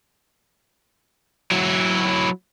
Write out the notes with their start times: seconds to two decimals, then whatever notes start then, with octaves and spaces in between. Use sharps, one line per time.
1.51 F#3 E4